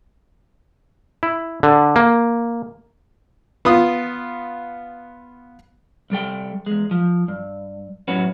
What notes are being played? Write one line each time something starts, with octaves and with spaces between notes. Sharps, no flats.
E4
D3
A#3
B3 F4 D#6
C2 G3 A4 G5
E2 G#3
F3
G2
F#2 A2 C#4 F#4 B4